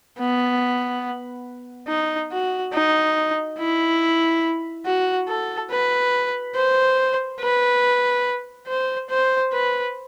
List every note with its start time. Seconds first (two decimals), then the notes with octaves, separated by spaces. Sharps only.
0.19 B3
1.88 D#4
2.31 F#4
2.74 D#4
3.58 E4
4.85 F#4
5.29 A4
5.71 B4
6.55 C5
7.40 B4
8.68 C5
9.10 C5
9.53 B4